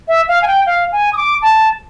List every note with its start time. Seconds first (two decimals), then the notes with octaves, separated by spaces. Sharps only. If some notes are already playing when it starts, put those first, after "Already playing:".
0.08 E5
0.28 F5
0.42 G#5
0.47 G5
0.66 F5
0.92 G#5
1.13 D#6
1.17 D6
1.42 A5